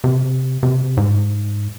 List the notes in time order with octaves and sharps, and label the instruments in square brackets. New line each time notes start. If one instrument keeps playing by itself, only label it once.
[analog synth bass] C3
C3
G#2